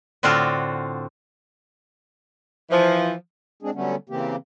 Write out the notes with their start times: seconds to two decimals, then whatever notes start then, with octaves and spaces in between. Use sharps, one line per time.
0.23 A2 D3 C4 D4 F4 F#4
2.70 E3 F3
3.63 G#3 C4 D4 G#4
3.74 D3 F#3 G3 A3 B3 C#4
4.09 C#3 E3 A#3 C4 G4